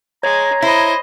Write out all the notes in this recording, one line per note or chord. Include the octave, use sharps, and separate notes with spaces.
G#3 C#5 A#5 G#6
E4 C5 D#5